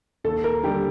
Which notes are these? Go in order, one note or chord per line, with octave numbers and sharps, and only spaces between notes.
D#2 A4
A#4
D3 G3 G4